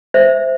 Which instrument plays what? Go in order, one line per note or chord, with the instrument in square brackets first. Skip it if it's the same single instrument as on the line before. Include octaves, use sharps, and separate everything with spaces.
[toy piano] C5 E5